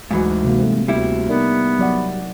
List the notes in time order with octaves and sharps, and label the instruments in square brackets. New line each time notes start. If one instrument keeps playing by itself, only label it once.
[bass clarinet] D2 [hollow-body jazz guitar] G#2 E3 F#3
[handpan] C3 A#3
A3 C4
[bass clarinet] D2 [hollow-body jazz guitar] G3 E4 [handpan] B3
[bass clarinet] B3 [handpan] D#4 A#4 D5
[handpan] F#3 D5 F#5